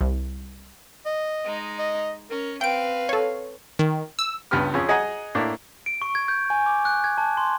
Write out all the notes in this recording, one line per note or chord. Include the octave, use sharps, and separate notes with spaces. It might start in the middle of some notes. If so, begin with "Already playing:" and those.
C2
D#5
G#3 D#4
D#5
C#4 A#4
C4 B4 F5 G5 D7
A4 C#5
D#3
E6
C#2 G2 B3 G4 B4 F6
F2 C#4 G#4
G#4 D#5 F#5 G#5 A#5
A2 A3 A#3 D4
D7
C#6
G#6
G6
G#5
D6
F#6
G#6
A5
C6